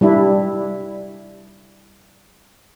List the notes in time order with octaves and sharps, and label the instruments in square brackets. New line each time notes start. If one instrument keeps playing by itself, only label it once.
[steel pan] G3 D4 E4